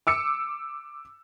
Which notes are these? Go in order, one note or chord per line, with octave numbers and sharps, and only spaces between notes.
D6 E6 C#7